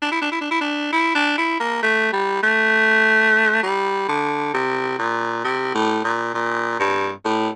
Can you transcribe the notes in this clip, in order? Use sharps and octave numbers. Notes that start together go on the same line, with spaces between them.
D4
E4
D4
E4
D4
E4
D4
E4
D4
E4
A#3
A3
G3
A3
G3
D3
C3
A#2
C3
A2
A#2
A#2
G2
A2